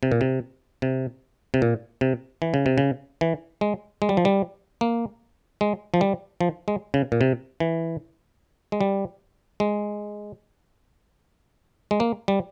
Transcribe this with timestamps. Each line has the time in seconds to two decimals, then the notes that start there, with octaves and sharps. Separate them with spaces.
0.03 C3
0.12 A#2
0.21 C3
0.82 C3
1.54 C3
1.62 A#2
2.01 C3
2.42 E3
2.54 C#3
2.66 C3
2.78 C#3
3.21 E3
3.61 G#3
4.02 G#3
4.09 G3
4.17 F3
4.25 G3
4.81 A#3
5.61 G#3
5.94 F3
6.01 G3
6.41 F3
6.68 G#3
6.94 C#3
7.12 A#2
7.21 C3
7.60 E3
8.72 G#3
8.81 G3
9.60 G#3
11.91 G#3
12.00 A#3
12.28 G3